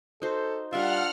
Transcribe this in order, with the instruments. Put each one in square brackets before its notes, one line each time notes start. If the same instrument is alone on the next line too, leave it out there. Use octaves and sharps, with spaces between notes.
[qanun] D#4 F#4 C5 [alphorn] A4
[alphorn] G3 [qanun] D4 A#4 E5 [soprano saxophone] F4 [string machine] F#5 F6